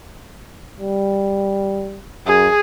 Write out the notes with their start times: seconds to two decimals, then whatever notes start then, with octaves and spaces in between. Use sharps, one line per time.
0.79 G3
2.26 F#2 G#4